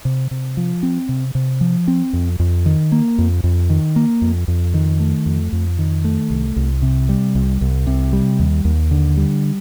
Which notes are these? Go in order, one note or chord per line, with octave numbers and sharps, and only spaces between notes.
C3
C3
F3
C4
C3
C3
F3
C4
F2
F2
D#3
A#3
F2
F2
D#3
A#3
F2
F2
D#3
A3
F2
F2
D#3
A3
C2
C2
C3
G3
C2
C2
C3
G3
D#2
D#2
D3
G3